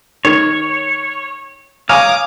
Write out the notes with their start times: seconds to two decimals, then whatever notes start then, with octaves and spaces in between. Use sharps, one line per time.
0.25 D#3 C#5
1.89 C#5 F5 G#5 A#5 D6 D#6